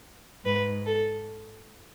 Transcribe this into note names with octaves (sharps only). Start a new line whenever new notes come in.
G#2 B4
A4